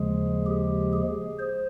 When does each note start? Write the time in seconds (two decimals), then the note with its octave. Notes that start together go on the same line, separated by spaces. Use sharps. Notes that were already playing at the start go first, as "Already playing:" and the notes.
Already playing: D#2 C#3 F3 G#3 G#4
0.46 G4
0.93 G#4
1.39 C5